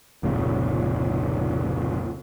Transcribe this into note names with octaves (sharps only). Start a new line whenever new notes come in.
F1 C#2 A#2 C#3